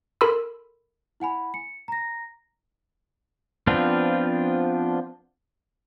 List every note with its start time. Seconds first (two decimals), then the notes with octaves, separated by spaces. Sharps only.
0.21 A4 A#4 B5 C6 E6
1.20 E4 F#5 G#5 B5
1.54 C#7
1.88 A#5 A#6
3.67 F3 B3 C4 D4 F4